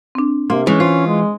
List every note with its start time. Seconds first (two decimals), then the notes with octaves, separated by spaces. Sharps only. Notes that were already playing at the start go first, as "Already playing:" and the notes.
0.15 C4 D4
0.50 C3 A#3 C6
0.67 E3 G#3 C#4
0.80 F4 C5
1.06 G#3